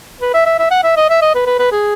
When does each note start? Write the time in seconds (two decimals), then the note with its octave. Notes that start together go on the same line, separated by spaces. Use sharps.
0.21 B4
0.34 E5
0.46 E5
0.59 E5
0.71 F#5
0.83 E5
0.97 D#5
1.10 E5
1.22 D#5
1.35 B4
1.46 B4
1.59 B4
1.72 G#4